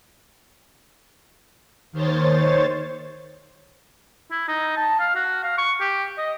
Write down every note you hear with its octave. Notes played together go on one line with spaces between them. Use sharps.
D#2 D#3 C5 C#5 A6
E4
D#4
A5
F5
F#4
F5
C#6
G4
D#5